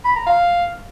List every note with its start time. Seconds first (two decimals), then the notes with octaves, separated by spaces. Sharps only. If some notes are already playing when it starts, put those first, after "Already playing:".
0.05 B5
0.16 A#5
0.27 F5